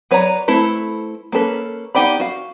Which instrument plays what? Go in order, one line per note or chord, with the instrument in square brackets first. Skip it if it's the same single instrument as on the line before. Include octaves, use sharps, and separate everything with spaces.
[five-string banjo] F#3 B4 C#5 D5 A#5
A3 C4 E4 A4 B4
A#3 C#4 A4 B4
B3 D#4 G4 D5 B5
F#4 F5